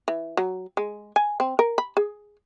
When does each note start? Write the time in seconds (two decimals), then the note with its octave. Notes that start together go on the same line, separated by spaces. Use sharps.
0.08 E3
0.37 F#3
0.77 G#3
1.16 G#5
1.40 C4
1.59 A#4
1.78 B5
1.97 G#4